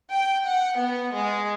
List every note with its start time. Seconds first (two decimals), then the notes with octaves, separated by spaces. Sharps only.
0.10 G5
0.45 F#5
0.79 B3
1.13 G#3